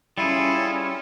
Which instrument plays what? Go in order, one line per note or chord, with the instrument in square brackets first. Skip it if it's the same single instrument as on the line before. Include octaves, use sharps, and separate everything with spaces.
[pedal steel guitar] G3 F4 G#4 [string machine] C#4 [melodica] E4 [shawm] A4